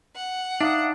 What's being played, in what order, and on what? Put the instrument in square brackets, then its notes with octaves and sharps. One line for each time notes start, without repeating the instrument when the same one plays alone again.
[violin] F#5
[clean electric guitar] D4 [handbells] D#4 [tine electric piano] E5 F5 D#6